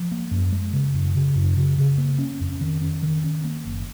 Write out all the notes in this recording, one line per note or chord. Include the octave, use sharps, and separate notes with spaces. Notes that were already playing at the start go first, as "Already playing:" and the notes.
Already playing: F3
A#3
F#2
G#3
C#3
F#2
C#3
F#2
C#3
C#3
A#3
C#4
F2
D#3
C#4
D#3
C#4
A#3
F#1